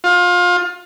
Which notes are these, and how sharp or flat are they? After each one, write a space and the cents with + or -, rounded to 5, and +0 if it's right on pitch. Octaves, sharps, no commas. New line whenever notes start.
F4 +25